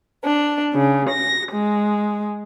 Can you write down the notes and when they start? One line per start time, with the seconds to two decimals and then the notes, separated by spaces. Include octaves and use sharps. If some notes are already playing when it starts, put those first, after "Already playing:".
0.24 D4
0.73 C#3
1.09 A#6
1.53 G#3